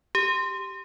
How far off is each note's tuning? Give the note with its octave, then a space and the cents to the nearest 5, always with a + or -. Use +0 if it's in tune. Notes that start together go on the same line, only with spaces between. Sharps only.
G4 -5